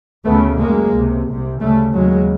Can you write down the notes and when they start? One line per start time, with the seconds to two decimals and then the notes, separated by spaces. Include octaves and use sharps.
0.25 D2 C#3 A3 B3
0.59 F#2 C#3 G#3 A#3
0.93 C#2 C3
1.27 C2 C3
1.61 D2 C#3 G3 A3
1.94 D#2 C#3 F#3 G#3